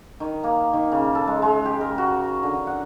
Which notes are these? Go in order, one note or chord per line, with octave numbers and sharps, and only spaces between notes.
D#3
A#3
D#3
C#3
A4
G#3
G#3
G4
A#4
F#4
D3
F#5